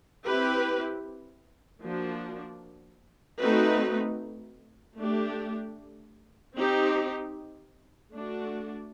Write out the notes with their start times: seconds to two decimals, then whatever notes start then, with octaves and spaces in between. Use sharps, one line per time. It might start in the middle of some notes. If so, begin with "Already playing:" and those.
0.24 C4 E4 G4 B4
1.82 F3 A#3 D4 F#4
3.39 A3 C4 D#4 F#4 B4
4.98 A3 D4 G4
6.55 C4 D#4 G4
8.14 A3 D4 F#4